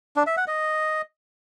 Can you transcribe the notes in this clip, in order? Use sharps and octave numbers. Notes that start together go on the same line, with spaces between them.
D4
E5
F#5
D#5